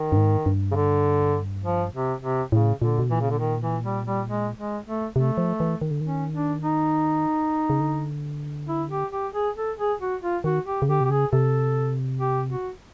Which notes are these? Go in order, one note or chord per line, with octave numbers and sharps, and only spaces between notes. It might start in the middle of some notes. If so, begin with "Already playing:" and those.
Already playing: D#3
G2
G#2
G2
C#3
D3
F3
C3
C3
A2 C#3
A#2 D3
B2
A#2 E3
C#3
D3
D#3
E3
G3
G3
G#3
G#3
A3
C3 A3
F3
E3
D#3
D3
D#3 C#4
D4
D#4
C#3
D3
E4
G4
G4
G#4
A4
G#4
F#4
F4
D#3 F#4
G4
C#3
D3 G4
C3 G4
C#3 G#4
C3 A4
G4
F#4